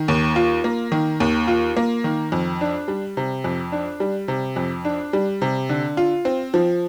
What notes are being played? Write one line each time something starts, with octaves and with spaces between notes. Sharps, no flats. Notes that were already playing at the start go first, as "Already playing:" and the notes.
Already playing: D#3
D#2
F4
A#3
D#3
D#2
F4
A#3
D#3
F2
D4
G3
C3
F2
D4
G3
C3
F2
D4
G3
C3
D3
F4
C4
F3